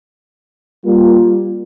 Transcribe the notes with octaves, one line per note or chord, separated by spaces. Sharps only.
G3 A#3 F4